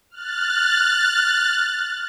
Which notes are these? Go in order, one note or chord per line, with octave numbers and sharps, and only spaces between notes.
F6 F#6 A6